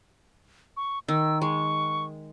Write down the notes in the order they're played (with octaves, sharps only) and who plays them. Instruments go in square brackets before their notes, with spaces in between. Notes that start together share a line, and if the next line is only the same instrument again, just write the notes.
[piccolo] C#6
[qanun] D#3 [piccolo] E6
[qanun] G#3 [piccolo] C#6